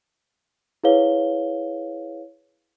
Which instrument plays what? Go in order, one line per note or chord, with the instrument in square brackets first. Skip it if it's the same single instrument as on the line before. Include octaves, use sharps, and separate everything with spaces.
[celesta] E4 G#4 B4 C#5 F5 G7